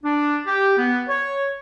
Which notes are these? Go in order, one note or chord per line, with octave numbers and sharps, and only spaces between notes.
D4
G4
B3
C#5